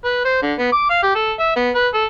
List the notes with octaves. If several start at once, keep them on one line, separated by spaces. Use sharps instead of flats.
B4
C5
D3
B3
D6
F5
G4
A4
E5
B3
B4
A4